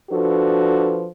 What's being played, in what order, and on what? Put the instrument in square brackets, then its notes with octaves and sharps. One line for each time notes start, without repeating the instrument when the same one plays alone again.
[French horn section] F3 D4 F#4 A4 B4